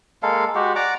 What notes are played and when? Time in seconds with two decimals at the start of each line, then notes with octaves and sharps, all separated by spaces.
0.23 G#3 A#3 A4 F5
0.55 G#3 F#4 G4
0.76 D5 F#5 A#5 D6